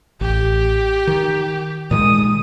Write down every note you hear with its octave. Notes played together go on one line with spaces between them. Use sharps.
A1 G4
D#3
A#2 D#3 G#3 D#6